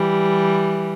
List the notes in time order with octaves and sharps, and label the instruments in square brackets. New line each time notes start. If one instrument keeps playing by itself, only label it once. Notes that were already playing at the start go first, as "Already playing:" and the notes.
Already playing: [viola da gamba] E3 G3